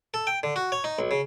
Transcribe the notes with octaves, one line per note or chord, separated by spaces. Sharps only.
A4
G5
D3
F#4
C#5
D#4
B1
C#3